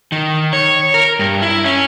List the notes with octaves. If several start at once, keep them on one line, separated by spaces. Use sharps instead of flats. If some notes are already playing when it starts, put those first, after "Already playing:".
D#3
C#5
A#4
G2
E4
C#4